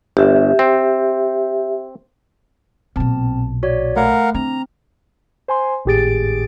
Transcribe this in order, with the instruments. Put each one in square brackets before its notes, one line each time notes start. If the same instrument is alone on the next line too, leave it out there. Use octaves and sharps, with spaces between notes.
[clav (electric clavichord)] G1 [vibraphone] G4 E5
[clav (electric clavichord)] C4
[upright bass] B1 A#2 [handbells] C4 A5
[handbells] F#4 C#5 D5
[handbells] A3 [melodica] A#4 F5 F#5
[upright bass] D3 [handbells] C4 [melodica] A#5
[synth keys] C5 G#5 C6
G#1 A2 G4 G#4 A6 D7